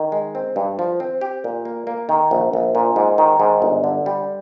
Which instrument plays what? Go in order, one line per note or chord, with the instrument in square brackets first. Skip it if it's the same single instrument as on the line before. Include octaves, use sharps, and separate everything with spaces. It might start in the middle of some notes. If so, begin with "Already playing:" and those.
Already playing: [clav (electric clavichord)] D#3
G#3
C4
G2
F3
C4
G4
A#2
A#3
A#3
D#3
A#1
A#1
A#2
G#2
D#3
G#2
G1
D3
G3